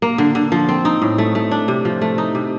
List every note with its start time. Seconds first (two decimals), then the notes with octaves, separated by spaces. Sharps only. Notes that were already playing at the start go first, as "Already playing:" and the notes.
0.02 A#3
0.18 D3
0.35 D3
0.52 F3
0.69 C4
0.85 D#4
1.02 A2
1.18 A3
1.35 A3
1.51 D4
1.68 C3
1.85 F3
2.01 A3
2.18 D#4
2.35 C3